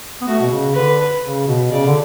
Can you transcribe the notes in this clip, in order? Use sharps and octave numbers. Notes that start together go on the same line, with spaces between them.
B3
A3 F#4
B2
C#3
D3 B4
C#3
B2
C#3 D5
D3